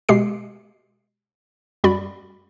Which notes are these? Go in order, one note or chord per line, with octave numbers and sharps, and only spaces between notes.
B2 G#3 G4 C7
F#2 G3 F#4 D5 B5